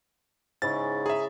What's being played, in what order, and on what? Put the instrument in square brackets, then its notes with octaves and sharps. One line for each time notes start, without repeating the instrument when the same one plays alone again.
[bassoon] G#2 [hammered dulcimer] C#3 E4 [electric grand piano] A6
[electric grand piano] G#4 E5 [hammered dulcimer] A#5